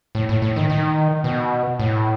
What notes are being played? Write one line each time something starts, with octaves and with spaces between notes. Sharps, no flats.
A2
A2
A2
D#3
D#3
B2
A2